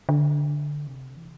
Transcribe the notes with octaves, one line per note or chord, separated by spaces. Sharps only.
D3
C3
E3